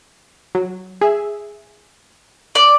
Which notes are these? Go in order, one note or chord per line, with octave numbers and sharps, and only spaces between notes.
F#3
G#4 E5
D5